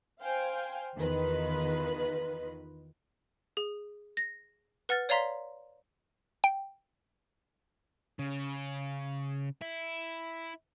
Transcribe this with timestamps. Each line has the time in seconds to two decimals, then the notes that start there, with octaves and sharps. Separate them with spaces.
0.21 C5 F5 G5 G#5
0.97 E2 D#3 F4 B4 D#5
3.57 G#4
4.17 A#6
4.89 B4 F#5 F6 A6
5.09 C#5 D5 F5 A#5 C6 B6
6.44 G5
8.19 C#3
9.62 E4